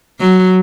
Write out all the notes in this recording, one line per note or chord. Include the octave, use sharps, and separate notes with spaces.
F#3